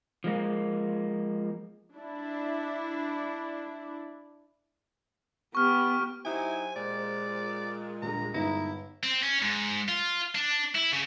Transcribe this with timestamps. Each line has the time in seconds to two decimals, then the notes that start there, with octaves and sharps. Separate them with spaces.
0.24 F3 G#3 A#3
1.95 D4 E4
5.55 B3 G4 C#6 F6
6.25 F#3 D#4 E4 G4 C5 G#5
6.76 A#2 G#3 D5
8.02 D#1 D3 A#5
8.34 G1 D#4 E4 A#6
9.03 C4
9.22 C#4
9.41 G#2
9.88 F4
10.35 D4
10.75 E4
10.92 C#3